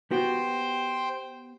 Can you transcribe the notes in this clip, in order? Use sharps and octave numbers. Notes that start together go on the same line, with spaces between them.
B3 F#4 G4 C5 G5